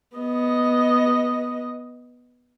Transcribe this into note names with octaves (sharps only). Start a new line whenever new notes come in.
B3 D#5